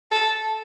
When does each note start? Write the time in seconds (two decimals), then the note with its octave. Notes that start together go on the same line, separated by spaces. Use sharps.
0.11 A4